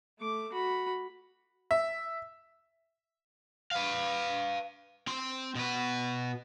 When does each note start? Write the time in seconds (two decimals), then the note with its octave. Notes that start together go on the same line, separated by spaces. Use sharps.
0.19 A3 D6
0.53 F#4 B5
1.71 E5
3.71 B4 F5
5.07 C4 C6
5.55 B2 B4